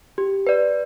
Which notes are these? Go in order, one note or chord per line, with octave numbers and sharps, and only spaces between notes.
G4
B4 D5